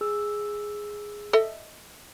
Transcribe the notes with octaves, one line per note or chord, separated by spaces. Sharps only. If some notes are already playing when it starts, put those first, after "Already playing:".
G#4 E6
A4 D#5 E5